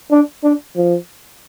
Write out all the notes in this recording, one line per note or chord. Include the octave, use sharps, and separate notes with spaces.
D4
D4
F3